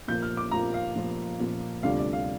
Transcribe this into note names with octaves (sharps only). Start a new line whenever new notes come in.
A#2 F3 A#3 F4 G6
F6
D6
A#2 F3 A#3 F4 A#5
F5
A#2 F3 A#3 F4
A#2 F3 A#3 F4
D2 C3 G3 D4 F4 F5
D5
F5